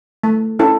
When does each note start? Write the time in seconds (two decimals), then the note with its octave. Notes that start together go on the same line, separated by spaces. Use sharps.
0.24 A3
0.59 C#4 E4 A4